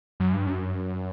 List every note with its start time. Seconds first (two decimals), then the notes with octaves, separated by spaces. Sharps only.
0.20 F#2
0.34 G2
0.46 F#2